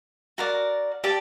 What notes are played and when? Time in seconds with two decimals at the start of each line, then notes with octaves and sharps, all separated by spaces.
0.38 F#4 A#4 D5
1.04 G4 D5 A5